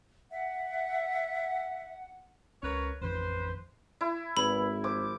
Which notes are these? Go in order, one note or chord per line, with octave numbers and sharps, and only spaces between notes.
E5 F#5
C#2 C#4 A#4 B4 C#5
A1 F2 D#3 B4 C5
E4
G#1 E2 B5
F3 D6